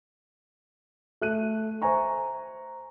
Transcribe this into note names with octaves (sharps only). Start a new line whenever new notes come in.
A3 F#6 D#7
C5 E5 G#5 A#5 C#6